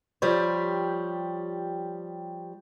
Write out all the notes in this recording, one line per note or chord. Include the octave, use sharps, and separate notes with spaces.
F3 G3 G4 C#5